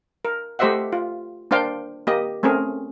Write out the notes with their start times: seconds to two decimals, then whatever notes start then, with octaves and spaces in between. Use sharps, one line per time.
0.25 A#4
0.59 A3 G4 C5 D#5 E5 F#5
0.93 F4
1.51 A#3 D4 C5 F5 G5
2.07 A#3 G4 D#5
2.43 A3 C4 C#4 G#4 A#4